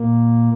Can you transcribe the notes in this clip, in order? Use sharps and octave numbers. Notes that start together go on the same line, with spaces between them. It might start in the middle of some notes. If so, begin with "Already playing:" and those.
Already playing: A#2 A#3